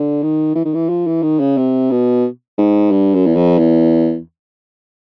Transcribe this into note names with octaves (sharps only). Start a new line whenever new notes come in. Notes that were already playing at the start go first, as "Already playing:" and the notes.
Already playing: D3
D#3
E3
D#3
E3
F3
E3
D#3
C#3
C3
B2
G#2
G2
F#2
E2
F2
E2